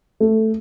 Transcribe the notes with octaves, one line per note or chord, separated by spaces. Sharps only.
A3